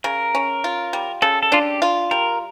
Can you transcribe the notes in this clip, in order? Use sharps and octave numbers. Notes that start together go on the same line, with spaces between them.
C#3 A#4
C#4
F4
G3
C#3 A4
A4
D4 F4
G4
F4
G3 A#4